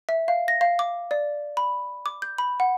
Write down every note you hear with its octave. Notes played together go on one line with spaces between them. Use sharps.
E5
F5
A#6
F5
D6
D5
B5
D6
G6
B5
F#5